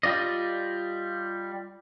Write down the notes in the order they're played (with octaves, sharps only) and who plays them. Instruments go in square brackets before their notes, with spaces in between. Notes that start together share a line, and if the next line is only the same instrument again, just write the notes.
[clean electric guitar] G3 F4 D5 D#5